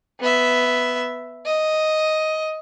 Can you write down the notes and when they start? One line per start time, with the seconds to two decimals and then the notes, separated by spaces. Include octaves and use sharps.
0.20 B3 E5
1.46 D#5